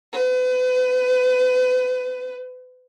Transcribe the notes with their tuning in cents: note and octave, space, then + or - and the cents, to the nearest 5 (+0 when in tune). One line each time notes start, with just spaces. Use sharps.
B4 +40